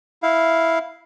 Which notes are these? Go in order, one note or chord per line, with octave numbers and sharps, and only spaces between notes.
E4 F5